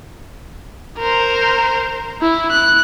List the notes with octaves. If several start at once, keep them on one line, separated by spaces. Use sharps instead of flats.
A#4 C5
E4
F#6